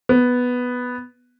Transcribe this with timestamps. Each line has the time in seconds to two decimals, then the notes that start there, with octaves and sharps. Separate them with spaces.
0.09 B3